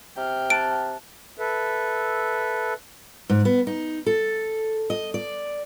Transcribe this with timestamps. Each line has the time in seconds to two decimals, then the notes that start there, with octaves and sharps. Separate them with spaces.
0.17 C3 G5 F6
0.50 A5 F#6 D7
1.37 A4 B4 E5
3.29 G#2
3.45 B3
3.67 D#4
4.06 A4
4.90 D#5
5.14 D5